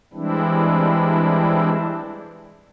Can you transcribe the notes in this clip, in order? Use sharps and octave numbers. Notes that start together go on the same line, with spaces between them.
E3 G3 G#3 C4 D4 E4